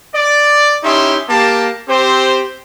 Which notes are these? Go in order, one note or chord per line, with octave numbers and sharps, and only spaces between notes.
D5
C#4 D#4 E4 G4 E5 C6
A#3 G4 A5
C4 G4 C5